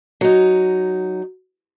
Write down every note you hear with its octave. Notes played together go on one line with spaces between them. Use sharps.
F#3 D#4